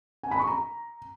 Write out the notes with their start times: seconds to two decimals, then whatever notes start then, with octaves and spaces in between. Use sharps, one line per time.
0.23 G#5
0.31 B5
0.39 C#6
0.47 A#5